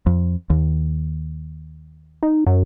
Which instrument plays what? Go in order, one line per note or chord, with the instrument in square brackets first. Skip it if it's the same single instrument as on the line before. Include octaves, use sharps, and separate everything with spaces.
[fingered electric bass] F2
D#2
[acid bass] D#4
F#2